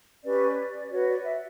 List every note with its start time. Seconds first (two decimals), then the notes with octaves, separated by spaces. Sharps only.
0.24 C#4 G4 B4 D5
0.90 F#4 B4 C#5
1.08 D5
1.24 E5